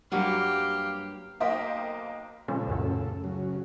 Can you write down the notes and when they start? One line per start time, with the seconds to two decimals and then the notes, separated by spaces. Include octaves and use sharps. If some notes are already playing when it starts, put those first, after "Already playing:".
0.12 G2 F#3 A#3 G4 F5
1.40 B1 A#3 C5 D#5 G5 B6
2.48 A#2 C#3 F3 G#3 C#4 A4
2.67 C#2 F#2 A2
3.24 C#3 F#3